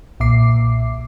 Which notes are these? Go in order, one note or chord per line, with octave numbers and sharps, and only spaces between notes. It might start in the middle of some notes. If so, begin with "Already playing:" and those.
B1 A#2 E5 D6 C7